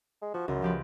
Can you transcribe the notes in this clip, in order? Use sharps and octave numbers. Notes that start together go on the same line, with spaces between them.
G#3
F3 F#4
C#2 F#2
F3 G4 B4